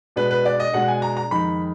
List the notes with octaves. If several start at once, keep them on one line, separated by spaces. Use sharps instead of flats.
B2 G#3 D4 B4
B4
D5
D#5
B2 G#3 D4 F#5
G#5
A#5
A#5
F2 D#3 G#3 D#4 B5